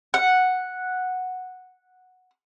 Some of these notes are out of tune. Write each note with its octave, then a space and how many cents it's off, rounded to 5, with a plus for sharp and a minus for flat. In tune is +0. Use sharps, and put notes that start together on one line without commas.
F#5 -5